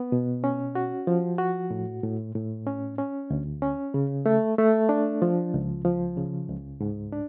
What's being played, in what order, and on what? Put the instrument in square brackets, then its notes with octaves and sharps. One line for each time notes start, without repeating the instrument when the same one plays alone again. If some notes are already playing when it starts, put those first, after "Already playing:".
Already playing: [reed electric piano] B3
B2
C#4
F#4
F3
F#4
A2
A2
A2
C#4
C#4
D2
C#4
C#3
A3
A3
D4
F3
C#2
F3
C#3
C#2
G#2
D4